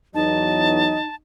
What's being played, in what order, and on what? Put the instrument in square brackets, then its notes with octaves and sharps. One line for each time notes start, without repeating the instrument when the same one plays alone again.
[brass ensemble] E2 F#3 [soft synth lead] D#4 [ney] D#5 [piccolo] A5